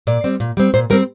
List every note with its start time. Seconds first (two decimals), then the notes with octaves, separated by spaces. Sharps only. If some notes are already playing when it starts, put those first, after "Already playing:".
0.07 A#2 D5
0.24 G3 C4
0.40 A#2
0.57 G3 C4
0.74 A#2 C5
0.90 G3 C4 A#4